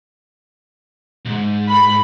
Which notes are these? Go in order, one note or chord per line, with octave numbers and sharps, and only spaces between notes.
C2 G#2
B5